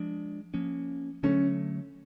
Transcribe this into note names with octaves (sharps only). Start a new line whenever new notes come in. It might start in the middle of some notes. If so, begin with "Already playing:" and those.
Already playing: F3 G#3 D4
F3 A#3 C#4
D3 F#3 A3 C#4